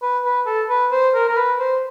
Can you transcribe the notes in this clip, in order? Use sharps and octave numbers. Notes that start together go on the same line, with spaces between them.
B4
B4
A4
B4
C5
A#4
A#4
B4
C5